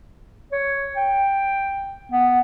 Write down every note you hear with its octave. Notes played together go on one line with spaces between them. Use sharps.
C#5
G5
B3